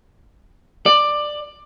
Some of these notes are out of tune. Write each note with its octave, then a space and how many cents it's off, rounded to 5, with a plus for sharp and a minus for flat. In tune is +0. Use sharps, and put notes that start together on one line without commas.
D5 +15